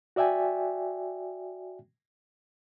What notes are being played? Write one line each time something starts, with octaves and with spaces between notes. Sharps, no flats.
F#4 D5 E5 G5 G#5